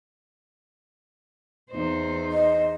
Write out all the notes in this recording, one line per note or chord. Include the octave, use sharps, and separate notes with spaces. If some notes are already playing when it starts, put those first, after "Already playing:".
E2 D#4 C5
D#5